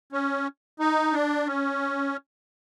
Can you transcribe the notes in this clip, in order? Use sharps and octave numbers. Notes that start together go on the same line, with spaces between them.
C#4
D#4
D4
C#4